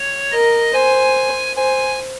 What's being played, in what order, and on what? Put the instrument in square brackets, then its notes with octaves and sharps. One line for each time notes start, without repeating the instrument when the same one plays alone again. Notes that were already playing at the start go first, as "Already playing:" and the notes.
Already playing: [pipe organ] C#5
[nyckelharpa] A#4 [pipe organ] D#5
[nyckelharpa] C5 [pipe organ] G#5
[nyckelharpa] C5 [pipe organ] G#5